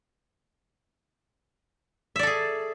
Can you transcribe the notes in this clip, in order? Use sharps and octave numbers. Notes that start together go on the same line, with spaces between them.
G#4 A4 D5 E5